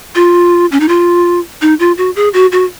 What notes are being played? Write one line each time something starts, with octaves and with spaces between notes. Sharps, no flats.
F4
C#4
D#4
F4
D#4
F4
F#4
G#4
F#4
F#4